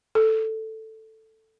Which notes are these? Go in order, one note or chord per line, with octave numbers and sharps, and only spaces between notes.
A4